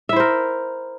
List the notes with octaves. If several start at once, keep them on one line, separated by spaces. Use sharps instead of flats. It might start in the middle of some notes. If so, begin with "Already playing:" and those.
E4 A#4 C5 E5